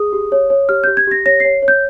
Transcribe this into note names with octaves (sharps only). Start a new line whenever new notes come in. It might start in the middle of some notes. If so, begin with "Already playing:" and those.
Already playing: G#4 D#6
G4
C#5
C#5
G4 F6
G4 G6
G#6
G4 A#6
C#5 A#6
C#5 C7
C#5
G6